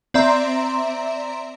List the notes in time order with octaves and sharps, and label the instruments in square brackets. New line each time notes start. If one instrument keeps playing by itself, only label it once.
[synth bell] C4 D5 E5 A#5 C6